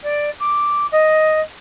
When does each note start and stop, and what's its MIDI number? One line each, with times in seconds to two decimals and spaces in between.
0.03 0.30 74
0.40 0.87 86
0.92 1.40 75